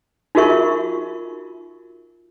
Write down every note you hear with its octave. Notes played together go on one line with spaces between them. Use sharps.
D#4 F4 F#4 A#4 E5 C#6